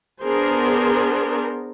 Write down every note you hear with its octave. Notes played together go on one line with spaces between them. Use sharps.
B3 D4 G#4 A#4 C5